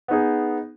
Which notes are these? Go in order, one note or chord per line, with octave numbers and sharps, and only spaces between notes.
B3 D#4 G#4